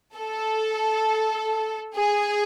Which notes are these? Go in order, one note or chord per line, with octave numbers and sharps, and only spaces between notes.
A4
G#4